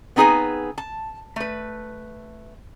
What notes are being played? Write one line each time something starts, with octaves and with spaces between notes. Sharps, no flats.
B3 C4 D#4 G#4 B4 G#5
A5
A3 B4